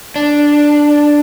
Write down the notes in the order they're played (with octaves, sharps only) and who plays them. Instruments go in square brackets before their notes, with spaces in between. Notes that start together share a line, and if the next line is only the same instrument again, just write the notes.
[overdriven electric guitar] D4